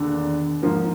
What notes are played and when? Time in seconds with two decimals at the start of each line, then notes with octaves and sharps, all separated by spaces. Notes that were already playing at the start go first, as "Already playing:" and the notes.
Already playing: E1 D#2 D3
0.62 G#2 F3 A#3